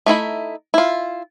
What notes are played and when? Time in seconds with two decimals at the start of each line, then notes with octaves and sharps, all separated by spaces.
0.06 A3 D#4 E4 B5
0.74 E4 F4